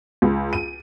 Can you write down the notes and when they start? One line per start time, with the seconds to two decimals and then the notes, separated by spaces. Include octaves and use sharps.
0.22 C#2
0.53 D#7